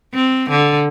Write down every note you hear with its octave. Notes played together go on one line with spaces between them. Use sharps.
C4
D3